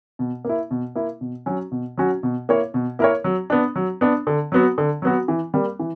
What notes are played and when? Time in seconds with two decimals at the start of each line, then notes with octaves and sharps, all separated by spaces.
0.19 B2
0.45 A#3 E4
0.71 B2
0.95 A#3 E4
1.21 B2
1.46 F#3 C#4 F#4
1.72 B2
1.98 F#3 C#4 F#4
2.23 B2
2.49 A#3 E4 A#4 C#5
2.74 B2
2.99 A#3 E4 A#4 C#5
3.24 F#3
3.50 B3 D4
3.76 F#3
4.01 B3 D4
4.27 D3
4.52 F#3 B3 F#4
4.78 D3
5.02 F#3 B3 F#4
5.28 E3
5.54 G3 A#3
5.79 E3